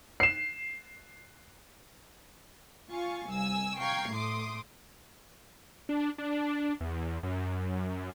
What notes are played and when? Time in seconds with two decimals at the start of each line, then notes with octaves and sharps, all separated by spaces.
0.20 C7 E7
2.89 F4 F5 G#5 C#6
3.31 C2 G#5 E6
3.79 F5 G5 A#5 C#6 G#6 C7
4.13 A2 A3 C6 D6 D#6
5.89 D4
6.18 D4
6.81 E2
7.23 F#2